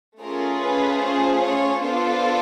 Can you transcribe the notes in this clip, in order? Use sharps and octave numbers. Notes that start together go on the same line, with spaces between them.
A3 C#4 F4 G#4 A#4
B4
C5
C#5
B3 D4 F4 A4 C5